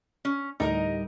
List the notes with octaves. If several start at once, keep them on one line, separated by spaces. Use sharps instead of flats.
C#4
D2 A2 G3 D#4 A#4 D#5